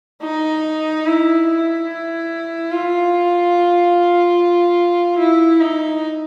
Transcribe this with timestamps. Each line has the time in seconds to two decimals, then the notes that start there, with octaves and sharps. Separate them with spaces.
0.23 D#4
1.06 E4
1.48 E4
2.71 F4
5.19 E4
5.61 D#4